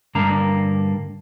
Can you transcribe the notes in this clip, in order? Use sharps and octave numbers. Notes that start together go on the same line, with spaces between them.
G2 D3 A#3 A#5